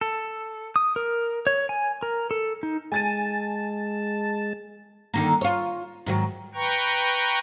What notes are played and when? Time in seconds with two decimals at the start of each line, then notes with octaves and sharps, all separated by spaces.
0.01 A4
0.76 D#6
0.96 A#4
1.47 C#5
1.69 G#5
2.03 A#4
2.31 A4
2.63 D#4
2.92 G#3 G#5 A5 A6 D#7
5.14 D3 D#3 A#3
5.41 F4 C#5
6.06 G#2 D#3 F#3
6.55 B4 G5 A#5 C#6